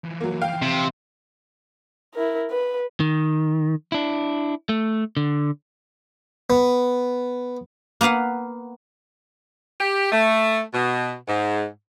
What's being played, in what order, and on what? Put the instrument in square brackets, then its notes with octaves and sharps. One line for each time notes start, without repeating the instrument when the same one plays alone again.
[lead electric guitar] E3 F3
[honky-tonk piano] F#3 A#3
F5 G5
[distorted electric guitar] C3
[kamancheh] E4 A#4
B4
[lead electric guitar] D#3
D4 E4
A3
D3
[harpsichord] B3
[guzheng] A#3 B3 B4 F5 F#5
[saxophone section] G4
A3
B2
G#2